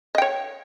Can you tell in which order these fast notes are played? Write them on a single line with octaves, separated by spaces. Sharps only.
D#5 G5 C#5